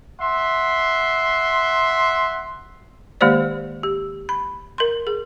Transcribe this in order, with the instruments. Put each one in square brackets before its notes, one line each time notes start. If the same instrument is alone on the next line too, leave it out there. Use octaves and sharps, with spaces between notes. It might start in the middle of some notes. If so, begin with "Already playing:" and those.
[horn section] E5 F#5 C6
[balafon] D#3 G#3 A#3 G4 C5 D5
G4
B5
A#4 C6
G#4